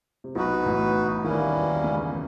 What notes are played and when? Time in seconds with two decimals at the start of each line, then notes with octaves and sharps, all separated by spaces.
0.24 C3
0.35 B1 B2 D#4 F#4 B4
0.66 A1 A2
1.24 D#2 D#3 G3 A#3 C#4 E4
1.54 E2 E3
1.84 C#2 C#3